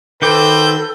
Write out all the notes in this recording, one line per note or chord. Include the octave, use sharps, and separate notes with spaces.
D#3 F#4 A4 B4 C5 G5 D6 G6